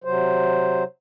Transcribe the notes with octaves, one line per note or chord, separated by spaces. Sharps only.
C3 F#3 C5